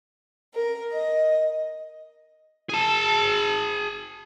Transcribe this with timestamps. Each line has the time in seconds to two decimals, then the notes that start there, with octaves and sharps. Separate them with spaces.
0.55 A#4
0.93 D#5
2.70 G#4 A5